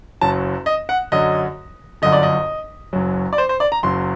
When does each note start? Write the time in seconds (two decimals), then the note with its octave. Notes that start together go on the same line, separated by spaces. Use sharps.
0.21 F#1 F#2 F#3 A5
0.66 D#5
0.89 F#5
1.12 F#2 D3 F#3 D#5
2.02 G1 F#2 D3 D#5
2.12 D5
2.23 D#5
2.93 F#1 F#2 F#3
3.33 D5
3.38 C5
3.49 C5
3.60 D5
3.72 A#5
3.83 F#1 F#2 F#3 C6